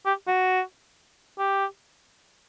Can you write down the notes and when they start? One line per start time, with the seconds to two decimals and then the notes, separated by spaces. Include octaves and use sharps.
0.06 G4
0.28 F#4
1.39 G4